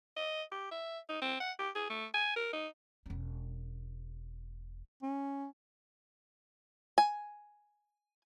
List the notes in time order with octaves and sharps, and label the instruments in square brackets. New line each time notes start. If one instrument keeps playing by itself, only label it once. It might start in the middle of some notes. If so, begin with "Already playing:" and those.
[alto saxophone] D#5
G4
E5
D#4
C4
F#5
G4
G#4
A3
G#5
A#4
D#4
[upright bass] E1 C#4
[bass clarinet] C#4
[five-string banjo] G#5